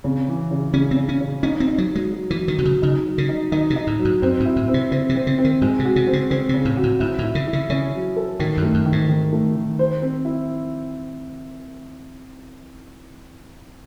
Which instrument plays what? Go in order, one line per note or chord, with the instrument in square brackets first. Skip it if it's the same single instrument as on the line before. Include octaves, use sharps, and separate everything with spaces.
[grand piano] C#3 [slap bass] C4
[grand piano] E3
C#3
[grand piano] C#3 [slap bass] C#4
[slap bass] C4
[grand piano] C#3
[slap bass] C#4
[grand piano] C#3
[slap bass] C#4 [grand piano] D#4
[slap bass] C4
[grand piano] D#4
[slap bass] F#3
[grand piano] F#3 [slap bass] G#3
[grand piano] F#3
[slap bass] E3
[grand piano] F#3
[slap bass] D#3
[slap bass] C3 [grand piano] F#3
[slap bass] C#3
[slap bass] C#3 [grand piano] D#4
[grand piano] F#3
[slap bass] C#3
[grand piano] D#4
[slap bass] D#3 [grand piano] D#4
[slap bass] C3
[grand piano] D#4
[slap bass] A2
[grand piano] F#3
[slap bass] G#2
[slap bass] F#2 [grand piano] C4
[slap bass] G#2
[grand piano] E4
[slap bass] A2
[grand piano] C4
[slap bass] C3
[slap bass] C#3 [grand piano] C4
[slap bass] C3
[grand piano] C4
[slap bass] C#3
[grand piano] C4
[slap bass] D#3
[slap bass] G#2 [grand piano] G#3
[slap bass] C3
[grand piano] F#4
[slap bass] C3
[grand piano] C4
[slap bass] C#3
[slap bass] C#3 [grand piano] C4
[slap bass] C3
[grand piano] C#3
[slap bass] A2
[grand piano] F#4
[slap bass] A2
[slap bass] G#2 [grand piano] E4
[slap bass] A2
[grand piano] E4
[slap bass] C#3
[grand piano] E4
[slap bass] C#3
[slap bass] C#3 [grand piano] C#4
[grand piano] F#3
A4
[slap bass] A2 [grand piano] D#3
[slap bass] F#2
[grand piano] A3
[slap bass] F#2
[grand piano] D#3
[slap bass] G#2
[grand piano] D#3
A3
D#3
C5
C4
E4